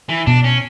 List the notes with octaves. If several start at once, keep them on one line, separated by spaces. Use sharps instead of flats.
E3
B2 D4
C#4